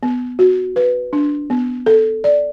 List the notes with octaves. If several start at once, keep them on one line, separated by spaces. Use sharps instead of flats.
B3
F#4
B4
D4
B3
A4
D5